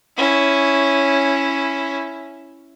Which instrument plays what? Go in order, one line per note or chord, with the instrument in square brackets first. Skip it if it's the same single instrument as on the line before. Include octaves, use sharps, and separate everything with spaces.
[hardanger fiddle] C#4 E4